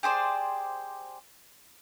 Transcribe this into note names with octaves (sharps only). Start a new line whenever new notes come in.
G4 G#4 C5 D5